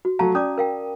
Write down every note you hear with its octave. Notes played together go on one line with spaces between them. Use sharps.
F#4
F#3 A3 F#4 F5 A5 A#5
C#4 D5 D6 D#6
A#4 F5 G5